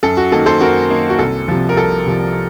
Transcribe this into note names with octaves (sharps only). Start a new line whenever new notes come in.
F#2 A4
F#4
D#3 A#3 D#4 A4
A4 C5
F#2 F#4 A#4
D#3 A#3 D#4
F#4
C2 A4
C3 F3
A#4
C2 A4
C3 F3